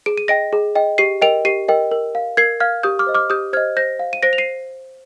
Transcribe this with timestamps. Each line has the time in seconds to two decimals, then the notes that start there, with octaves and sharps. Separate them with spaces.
0.06 G#4 D7
0.18 D#7
0.28 D#5 G5 A#6 D7
0.53 G#4
0.75 D#5 G5
0.98 G4 C7 D#7
1.22 A#4 D#5 G5 D7 F7
1.45 G4 C7 D#7
1.68 A#4 D#5 G5
1.92 A#4
2.15 F5
2.37 A#4 G#6 C7
2.60 F5 F6 G#6
2.83 G4 D#6 G6
2.99 D6 F6
3.07 C5 D#5
3.15 D6 F6
3.30 G4 D#6 G6
3.53 C5 D#5 F6 G#6
3.77 C5 G6 A#6
3.99 F5
4.13 D#7
4.23 C5 A#6 D7
4.33 F7
4.38 C7 D#7